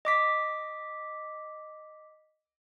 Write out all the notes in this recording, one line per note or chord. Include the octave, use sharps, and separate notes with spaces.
D#5 D6 B6